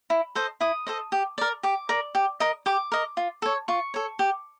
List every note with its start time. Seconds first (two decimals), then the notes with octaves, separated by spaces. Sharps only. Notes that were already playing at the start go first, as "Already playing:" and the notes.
0.10 E4
0.35 A4 C5 D#5
0.60 E4 D#6
0.87 A4 C5 D#5
1.12 G4
1.38 A#4 D5
1.63 G4 D6
1.89 A#4 D5
2.15 G4
2.40 A#4 D#5
2.66 G4 D6
2.92 A#4 D#5
3.17 F4
3.42 A4 C#5
3.68 F4 C#6
3.94 A4 C#5
4.19 G4